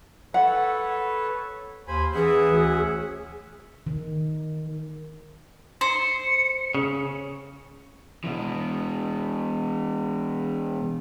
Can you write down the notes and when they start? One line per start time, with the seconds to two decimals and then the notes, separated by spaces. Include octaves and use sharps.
0.34 A4 B4 C#5 F#5
1.88 D#2 C5 G#5 B5
2.14 E3 C#4 G#4 E5 F#5
2.52 D2
3.87 D#3
5.81 C5 C#7
6.75 C#3
8.24 B2 E3